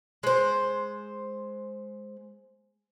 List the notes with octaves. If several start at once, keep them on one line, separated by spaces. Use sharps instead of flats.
G#3 C5